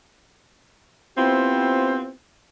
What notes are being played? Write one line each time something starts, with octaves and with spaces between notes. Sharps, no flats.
B3 C4 E4 F4 G4 C5